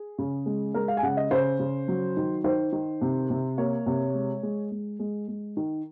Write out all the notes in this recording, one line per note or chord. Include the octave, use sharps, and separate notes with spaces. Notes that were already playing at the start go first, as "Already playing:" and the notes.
Already playing: G#4
C#3
G#3
G#3 A#4
F5
G#5
C#3 F#5
D#5
C#3 C5
C#3
F#3
D#3
D#3 C5
D#3
C3
C3
A#3 C#5
C3
G#3
G#3
G#3
G#3
G#3
D#3